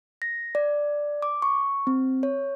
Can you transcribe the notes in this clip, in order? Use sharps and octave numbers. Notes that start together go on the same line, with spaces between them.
A#6
D5
D6
C#6
C4
C#5